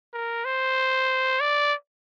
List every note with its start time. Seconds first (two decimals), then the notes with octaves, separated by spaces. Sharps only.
0.13 A#4
0.45 C5
1.40 D5